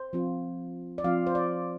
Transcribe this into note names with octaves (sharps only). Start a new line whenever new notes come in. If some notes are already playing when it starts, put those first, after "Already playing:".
Already playing: C5
F3 C4 F4
D5
F3 C4 F4 F5
C5
D5